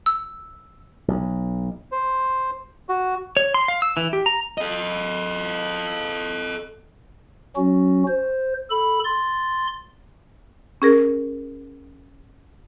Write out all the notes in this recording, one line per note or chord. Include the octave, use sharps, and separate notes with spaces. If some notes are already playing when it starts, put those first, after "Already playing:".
E6
B1
C5
F#4
C#5
C6
F5
E6
E3
G4
A#5
A4 D#5
F#3 C#4 F#4
C5
A4 B5
C6 A6
C#4 G#4 A#4